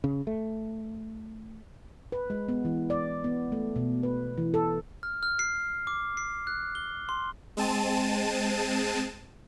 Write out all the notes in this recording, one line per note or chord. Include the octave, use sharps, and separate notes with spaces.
C#3
A3
B4
G#3
B3
E3
D5
B3
A3
B2
B4
E3
A4
F6
F6
C7
D6
C7
F#6
G7
C6
G#3 C4 A5 D#7